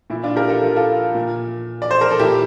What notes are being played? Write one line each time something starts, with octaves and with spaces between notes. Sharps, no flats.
A#2 E4
D4 F4
G4 A#4
F4 A4
F4 A4
F4 A4
A#2
D5
C5
A#4
A4
A#2 E4 G4